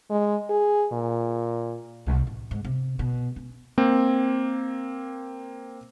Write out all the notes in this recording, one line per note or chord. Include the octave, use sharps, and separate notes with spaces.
G#3
G#4
A#2
C2
A1
G#2
C3
B2
C#4
A#3 C4